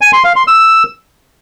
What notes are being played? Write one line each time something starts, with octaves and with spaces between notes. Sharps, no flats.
G#5
C6
F5
C6
E6